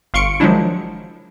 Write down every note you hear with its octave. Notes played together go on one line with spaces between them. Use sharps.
G1 F5 C6 C#6 C#7 D7
D#3 F3 F#3 G#3 D4 E4